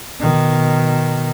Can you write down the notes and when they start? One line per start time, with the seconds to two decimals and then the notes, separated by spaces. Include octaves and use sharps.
0.20 B2 D#3